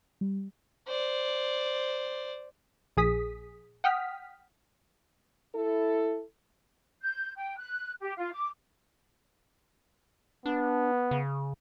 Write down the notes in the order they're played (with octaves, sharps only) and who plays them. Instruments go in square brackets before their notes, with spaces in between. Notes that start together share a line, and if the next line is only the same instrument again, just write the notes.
[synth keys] G3
[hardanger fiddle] C5 D5
[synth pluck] A#1 G#4 D#6 B6
F#5 G5 D#6 F6 B6
[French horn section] E4 A4
[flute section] G6
G5
F#6
G4
F4
D6
[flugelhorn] B3 [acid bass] D4
[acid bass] C#3